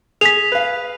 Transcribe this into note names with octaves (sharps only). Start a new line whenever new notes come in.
G#4 B6 F7
B4 F5